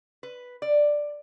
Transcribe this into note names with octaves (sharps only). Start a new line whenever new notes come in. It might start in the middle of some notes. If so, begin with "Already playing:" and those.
B4
D5